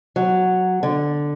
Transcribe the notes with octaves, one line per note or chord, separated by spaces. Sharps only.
F#3
D3